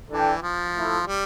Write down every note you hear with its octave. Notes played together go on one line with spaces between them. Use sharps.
E3 D4 A4 D5 G5
F3
A3 E4 A4
G3